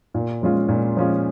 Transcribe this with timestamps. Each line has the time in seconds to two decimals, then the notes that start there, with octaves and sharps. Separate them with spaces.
0.14 A#2
0.42 F3 G#3 C#4 F4
0.69 A#2
0.97 F3 G#3 C#4 F4